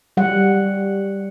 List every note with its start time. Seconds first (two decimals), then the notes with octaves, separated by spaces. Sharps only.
0.17 G3 F#5